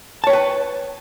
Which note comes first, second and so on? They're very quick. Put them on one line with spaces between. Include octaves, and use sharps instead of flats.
A5 C#5 G5 B4